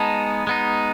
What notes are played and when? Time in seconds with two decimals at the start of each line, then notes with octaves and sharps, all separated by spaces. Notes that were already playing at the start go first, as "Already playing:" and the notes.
Already playing: G#3 B3 D#4 A5
0.47 G#3 B3 D#4